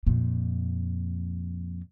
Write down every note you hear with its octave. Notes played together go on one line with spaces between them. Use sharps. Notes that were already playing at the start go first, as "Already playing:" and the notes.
F2 A#2